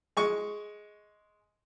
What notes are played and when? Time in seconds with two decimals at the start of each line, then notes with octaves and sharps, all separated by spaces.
0.17 G#3 C#6